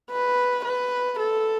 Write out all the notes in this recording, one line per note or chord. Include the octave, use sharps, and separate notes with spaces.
B4
B4
A4